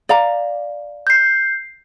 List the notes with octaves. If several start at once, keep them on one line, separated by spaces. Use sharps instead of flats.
D5 F5 A#5
G6 C7